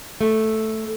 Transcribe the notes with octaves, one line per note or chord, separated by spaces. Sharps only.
A3